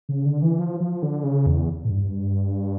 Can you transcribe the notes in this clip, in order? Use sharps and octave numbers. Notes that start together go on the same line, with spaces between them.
C#3
D3
E3
F3
F3
D3
C#3
E2
A2
G2